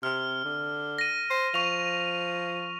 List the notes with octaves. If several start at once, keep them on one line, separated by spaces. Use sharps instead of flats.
C3 F6
D3
A#6 D#7
C5
F3 C#6 F7